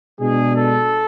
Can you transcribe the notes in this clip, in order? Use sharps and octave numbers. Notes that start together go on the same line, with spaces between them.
B2 G#3 D4 G#4
A4